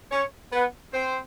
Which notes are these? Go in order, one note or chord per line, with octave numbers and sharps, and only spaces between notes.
C#4 C#5
B3 B4
C4 C5